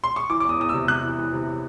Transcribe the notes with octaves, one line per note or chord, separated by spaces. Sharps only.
C6
C#6
E3 D6
D6
E2 D#6
E2 D#6
E6
C3
C3 F#6
E3
E3
C3